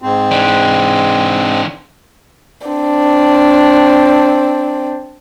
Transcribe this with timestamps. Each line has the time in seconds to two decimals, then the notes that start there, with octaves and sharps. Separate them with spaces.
0.02 G#2 C4
0.31 E3 D4
2.68 C4 D4